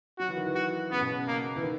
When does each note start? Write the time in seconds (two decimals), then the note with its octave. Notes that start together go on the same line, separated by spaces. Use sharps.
0.19 F#3 F#4
0.28 E3
0.37 D#3
0.46 E3
0.55 F#4
0.91 C#3 B3
1.01 B2
1.10 C#3
1.27 A#3
1.56 E3
1.63 D#3